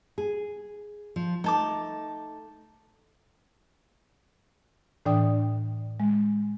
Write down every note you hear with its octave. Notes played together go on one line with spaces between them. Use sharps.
G#4
F3
A3 D#4 A5 D6
A2 E3 D4 D5 G5 D#6
G#3